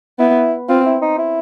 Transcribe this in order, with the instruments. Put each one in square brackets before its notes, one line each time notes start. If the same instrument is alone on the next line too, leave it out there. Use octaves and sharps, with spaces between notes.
[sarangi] B3 [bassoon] E4
[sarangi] C4 [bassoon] F4
[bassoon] E4
D#4
E4